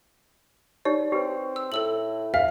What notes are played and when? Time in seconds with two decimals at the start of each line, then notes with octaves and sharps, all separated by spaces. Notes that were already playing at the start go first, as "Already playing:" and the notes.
0.85 D#4 G4 C#5 D5
1.12 C4 G4 B4
1.56 E6
1.72 A2 A4 E6 F#7
2.34 E5 F5